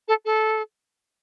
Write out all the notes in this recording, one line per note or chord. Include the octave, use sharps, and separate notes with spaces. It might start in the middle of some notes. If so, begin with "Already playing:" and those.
A4
A4